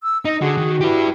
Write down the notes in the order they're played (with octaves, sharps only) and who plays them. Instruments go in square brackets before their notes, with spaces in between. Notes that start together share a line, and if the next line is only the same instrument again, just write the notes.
[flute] E6
[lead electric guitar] D#4 [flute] D#5
[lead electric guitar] D3 [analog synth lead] F#4 [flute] G#4
[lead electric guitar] D#3
[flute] E4 [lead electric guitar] G4 B4